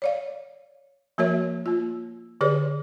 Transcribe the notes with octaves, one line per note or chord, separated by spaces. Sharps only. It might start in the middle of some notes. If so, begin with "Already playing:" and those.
C#5 D5 F5
F3 A#3 F#4 A#4 C#5 E5
A#3 F4
D3 G4 G#4 B4 C#5 D5